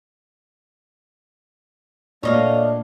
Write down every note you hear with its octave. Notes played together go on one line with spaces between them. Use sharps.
A#2 A3 D4 C#5 D#5 F5